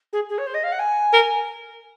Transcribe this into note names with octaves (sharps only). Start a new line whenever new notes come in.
G#4
G#4
C#5
C5
D#5
F5
F#5
G#5
A#4